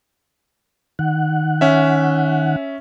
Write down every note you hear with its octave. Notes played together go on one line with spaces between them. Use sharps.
D#3 F#5
C#4 E5